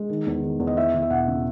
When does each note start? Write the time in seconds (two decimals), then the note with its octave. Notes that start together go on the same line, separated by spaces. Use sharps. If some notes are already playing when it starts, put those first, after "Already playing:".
Already playing: G#3
0.10 D#3
0.26 E2
0.43 D#3
0.60 E2
0.67 D#5
0.77 E3 E5
0.94 E3
1.02 E5
1.10 E1 F#5
1.28 C#3